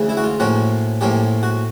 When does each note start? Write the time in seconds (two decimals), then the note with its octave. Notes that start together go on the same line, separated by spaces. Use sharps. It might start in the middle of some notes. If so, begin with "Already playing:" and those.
Already playing: D2 C#3 E3
0.09 E4
0.17 F#4
0.24 F4
0.40 A2 F3 A#3 C#4 F#4
1.01 A2 F3 A#3 C#4 G4
1.43 F#4